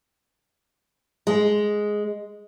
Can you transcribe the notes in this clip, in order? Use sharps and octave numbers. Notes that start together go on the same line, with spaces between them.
G#3